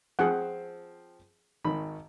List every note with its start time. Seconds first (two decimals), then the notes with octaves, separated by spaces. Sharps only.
0.19 F3 C4 G#4 F#5
1.65 G#1 D#3 B5